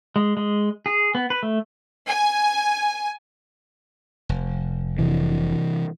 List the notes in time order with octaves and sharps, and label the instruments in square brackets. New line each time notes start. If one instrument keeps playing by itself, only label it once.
[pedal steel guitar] G#3
G#3
G#4
B3
B4
A3
[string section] G#5
[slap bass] F1
[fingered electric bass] C3 E3